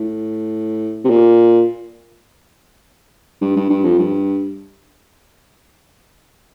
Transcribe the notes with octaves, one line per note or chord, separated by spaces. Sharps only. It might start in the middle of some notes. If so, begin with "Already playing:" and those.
Already playing: A2
C3
A#2
G2
G2
G2
F2
G2